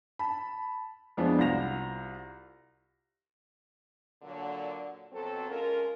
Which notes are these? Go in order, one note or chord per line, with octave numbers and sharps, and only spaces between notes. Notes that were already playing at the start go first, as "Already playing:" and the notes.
A5 B5
F2 F3 G#3 B3 D4 F4
C2 F4 F#4 A#6 F7
A#2 D3 F#3
F2 B2 F#3 C4 A4
G#3 C#4 F4 A4 A#4